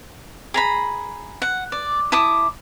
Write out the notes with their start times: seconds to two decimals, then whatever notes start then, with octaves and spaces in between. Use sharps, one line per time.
0.54 G#4 A#5 B5
1.42 F#5
1.72 D5
2.12 E4 A5 D6 D#6